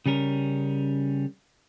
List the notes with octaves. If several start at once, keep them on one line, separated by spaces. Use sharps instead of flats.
C#3 G3 C#4 A#4